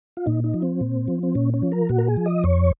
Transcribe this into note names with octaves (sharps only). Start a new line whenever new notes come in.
F4
A#2 D#4
D#4
F3
C4
A#2
F3
C4
A#2 C#4
C#4
F3
A#4
A#2 F#4
A#4
G#4
F3
D#5
F2 C#5